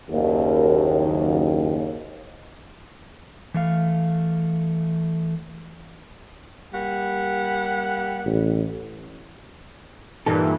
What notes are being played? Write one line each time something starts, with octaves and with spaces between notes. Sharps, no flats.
F#1 D#2
E3 A3 F5
G3 A#3 F#5
A1
G2 A#2 E3 D#4 G4 A4